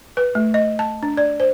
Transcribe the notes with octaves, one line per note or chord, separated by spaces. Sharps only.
B4
A3
D#5
A5
D4
D5
C5